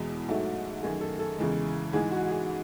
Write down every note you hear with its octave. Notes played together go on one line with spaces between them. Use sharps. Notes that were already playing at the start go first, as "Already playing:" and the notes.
Already playing: E2 B2 G#3
G#2 F#3 A3
F#2 D#3 A3 G#4
A4
A4
E2 C#3 E3 G#3
G#2 E3 G#3 G#4
F#4
G#4